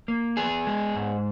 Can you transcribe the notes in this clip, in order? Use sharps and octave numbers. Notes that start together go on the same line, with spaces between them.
A#3
B3 G#4
G#3
G#2